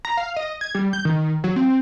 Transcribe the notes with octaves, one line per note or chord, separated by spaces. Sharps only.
A#5
F5
D#5
G#6
G3
G6
D#3
F#3
C4